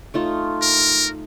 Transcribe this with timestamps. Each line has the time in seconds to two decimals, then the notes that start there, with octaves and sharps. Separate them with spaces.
0.14 A3 D#4 F4
0.62 A#4